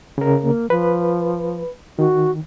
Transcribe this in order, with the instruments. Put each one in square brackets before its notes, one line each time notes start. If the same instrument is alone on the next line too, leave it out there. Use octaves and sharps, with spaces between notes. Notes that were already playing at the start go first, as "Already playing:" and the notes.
[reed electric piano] C#3 A#4
[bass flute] A#3
[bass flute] F3 [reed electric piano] B4
[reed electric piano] D#3 [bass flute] F#4